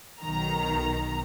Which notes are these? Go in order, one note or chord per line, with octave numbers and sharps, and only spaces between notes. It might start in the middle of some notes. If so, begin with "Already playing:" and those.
B1 D#3 A#5